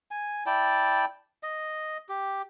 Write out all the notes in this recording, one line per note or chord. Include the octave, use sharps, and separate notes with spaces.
G#5
E4 D5 G5 A5
D#5
G4